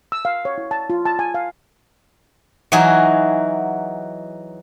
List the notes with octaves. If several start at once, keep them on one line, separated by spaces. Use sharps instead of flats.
E6
F5
C#5
E4
A5
F4
A5
G#5
F5
E3 F#3 D#4 F#4 G#4